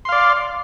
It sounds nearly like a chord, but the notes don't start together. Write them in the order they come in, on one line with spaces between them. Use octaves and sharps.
C6 F5 D5